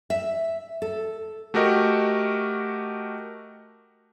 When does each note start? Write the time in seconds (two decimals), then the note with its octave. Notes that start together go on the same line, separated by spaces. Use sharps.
0.10 E5
0.82 A4
1.54 A3 F#4 G4 A#4 D#5